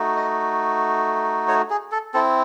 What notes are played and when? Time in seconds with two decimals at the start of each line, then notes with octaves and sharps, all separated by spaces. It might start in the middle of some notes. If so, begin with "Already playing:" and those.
Already playing: A3 D#4 F#4
0.16 D#5
1.48 C#5
1.70 G#4
1.92 A4
2.14 C4 E4 A4